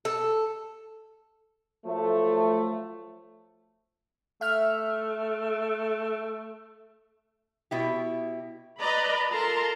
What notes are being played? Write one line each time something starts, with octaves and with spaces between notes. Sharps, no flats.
A4
F3 F#3 A3
A3 E5 F6
B2 E4 G4
B4 D5 D#5 A#5 B5
F4 A4 A#4 A5 A#5 C6